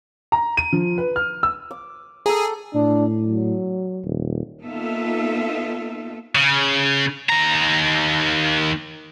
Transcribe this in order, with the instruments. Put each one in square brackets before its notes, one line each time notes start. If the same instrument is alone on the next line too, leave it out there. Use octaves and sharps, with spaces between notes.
[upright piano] A#5
D#7
F3
B4
F6
E6
[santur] D6
[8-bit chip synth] G#4 [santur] A4 G5 A#5
[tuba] A2 [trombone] D4
[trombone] F#3
[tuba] D#1
[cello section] A#3 B3 D#4 F4 A4 E5
[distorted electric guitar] C#3
D#2 A#5